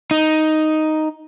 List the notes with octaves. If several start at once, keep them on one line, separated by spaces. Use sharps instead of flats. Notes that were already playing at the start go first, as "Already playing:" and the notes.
D#4